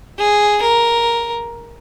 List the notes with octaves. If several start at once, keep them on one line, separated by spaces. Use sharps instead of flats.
G#4
A#4